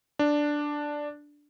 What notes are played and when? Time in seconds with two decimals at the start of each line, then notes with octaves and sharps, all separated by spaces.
0.19 D4